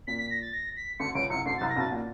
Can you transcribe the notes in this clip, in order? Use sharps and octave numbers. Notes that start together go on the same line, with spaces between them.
A#2 B6
B6
A#6
A6
A#6
B6
D2 D3 C#7
C#2 C#3 D7
C2 C3 C#7
D2 D3 C7
A6
C2 C3
A#6
B1 B2
A6
A#2